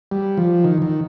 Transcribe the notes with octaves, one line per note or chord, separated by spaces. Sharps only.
G3
F3
D#3
D#3